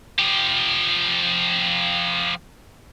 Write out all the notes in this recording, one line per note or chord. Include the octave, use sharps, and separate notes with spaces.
F3 G4